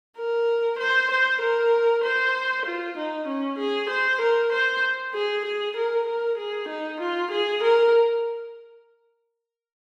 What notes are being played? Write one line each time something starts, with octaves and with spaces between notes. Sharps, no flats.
A#4
C5
C5
A#4
C5
F4
D#4
C#4
G#4
C5
A#4
C5
G#4
G#4
A#4
A#4
G#4
D#4
F4
G#4
A#4